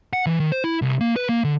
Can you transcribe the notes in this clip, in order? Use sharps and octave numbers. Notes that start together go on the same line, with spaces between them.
F#5
E3
D#3
C5
E4
C2
A#3
B4
A#3
D3